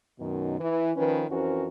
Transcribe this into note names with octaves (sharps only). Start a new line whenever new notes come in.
F#2 B2 D#3
E3
D#3 F3 C#4 B4
F2 E3 C#4 F#4 A#4 C5